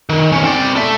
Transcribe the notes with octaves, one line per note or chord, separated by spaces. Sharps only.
D#3
B1 C#4
C4 D5
A4 E5